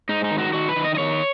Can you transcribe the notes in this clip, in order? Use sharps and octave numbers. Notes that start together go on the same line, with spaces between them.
G#2 D#4
D#4
D#3
F#4
D#3 F#4
B4
D#3
D#5
D#5
D#3 C#5